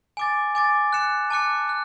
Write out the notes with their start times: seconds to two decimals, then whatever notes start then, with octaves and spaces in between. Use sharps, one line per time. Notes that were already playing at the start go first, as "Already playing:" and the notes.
0.17 G#5 D6 A6
0.55 G#5 D6 A6
0.93 F#6 C#7 E7
1.30 A5 D6 F#6 C#7
1.69 F#6